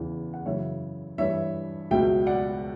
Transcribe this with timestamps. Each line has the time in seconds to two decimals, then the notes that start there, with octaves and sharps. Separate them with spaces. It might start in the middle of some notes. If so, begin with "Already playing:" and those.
Already playing: E2 C#3 E3
0.34 F#5
0.45 F#2 C#3 E3 C#5 E5
1.18 G2 E3 C#5 E5
1.91 C#2 B2 F#3 E5 G5
2.26 D5 F#5